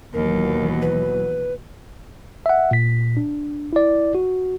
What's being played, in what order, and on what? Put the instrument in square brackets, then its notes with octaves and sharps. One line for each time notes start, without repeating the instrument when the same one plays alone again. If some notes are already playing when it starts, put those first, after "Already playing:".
[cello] D#2 [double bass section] B2 E3 F#3 [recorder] A#4
[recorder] B4
[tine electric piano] E5 F#5
A#2 B6
D4
E4 D5
F#4